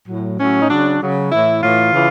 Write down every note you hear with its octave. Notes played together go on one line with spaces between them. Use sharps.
A2 F#3
A2 F#3 C#4
D#4
C#3 F#3 D4
C#3 F#3
A2 E3 E4
A2 E3 F4
C#3 E3